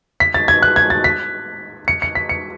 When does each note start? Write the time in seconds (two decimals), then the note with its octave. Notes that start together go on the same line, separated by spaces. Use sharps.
0.20 B6
0.34 A6
0.48 G#6
0.63 F#6
0.76 G#6
0.90 A6
1.04 B6
1.88 C#7
2.02 C#7
2.15 B6
2.29 C#7